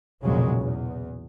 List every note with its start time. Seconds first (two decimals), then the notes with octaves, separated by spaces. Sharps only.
0.23 B1 F2 A#2 C#3 F#3 G#3
0.59 E2